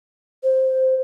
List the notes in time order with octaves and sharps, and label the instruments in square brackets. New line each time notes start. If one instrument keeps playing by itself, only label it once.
[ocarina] C5